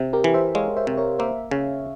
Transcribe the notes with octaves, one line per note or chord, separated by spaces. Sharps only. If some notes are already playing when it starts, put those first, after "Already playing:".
Already playing: C3
G4 A#4
E3
C5 E5
G#3 C#5 F5
C5 E5
C3
A#4 C#5
A#3 C5 E5
C#3 C#5 F5